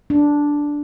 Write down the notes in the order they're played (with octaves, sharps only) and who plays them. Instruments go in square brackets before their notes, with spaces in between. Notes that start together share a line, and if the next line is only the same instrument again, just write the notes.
[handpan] D4